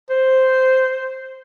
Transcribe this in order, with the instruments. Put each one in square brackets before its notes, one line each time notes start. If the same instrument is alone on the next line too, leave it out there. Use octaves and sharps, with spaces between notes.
[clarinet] C5